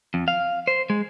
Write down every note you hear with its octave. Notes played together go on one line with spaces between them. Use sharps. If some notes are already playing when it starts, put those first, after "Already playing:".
F2
F5
C5
G#3